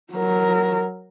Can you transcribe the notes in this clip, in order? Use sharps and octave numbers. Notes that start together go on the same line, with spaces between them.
F#3 A#4